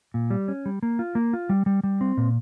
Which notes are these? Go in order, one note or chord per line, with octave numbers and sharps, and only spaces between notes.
A#2
G3
C#4
G3
A#3
F4
A#3
F4
G3
G3
G3
C4
A#2